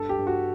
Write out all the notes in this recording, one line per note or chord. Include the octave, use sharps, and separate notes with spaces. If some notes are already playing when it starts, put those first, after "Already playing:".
Already playing: G2 A4
G4
G2
F#4